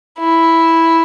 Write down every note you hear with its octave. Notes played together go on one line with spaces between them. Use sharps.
E4